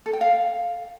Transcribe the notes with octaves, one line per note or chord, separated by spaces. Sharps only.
A4
G5
F5